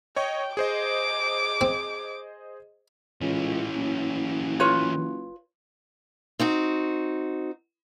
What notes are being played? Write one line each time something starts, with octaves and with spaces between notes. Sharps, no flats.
C#5 D#5 G5 C#6
G#4 C5 D#5 D6
C4
C#2 E3 C#4
F#1
F4 B4 C#5
C4 D#4 F#4